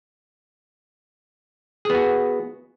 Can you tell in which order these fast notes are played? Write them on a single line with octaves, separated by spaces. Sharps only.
G#4 B3 F#4